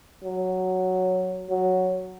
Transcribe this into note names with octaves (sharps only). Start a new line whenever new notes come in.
F#3
F#3